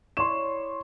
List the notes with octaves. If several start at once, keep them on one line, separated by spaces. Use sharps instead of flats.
E4 C#5 D5 C6 E7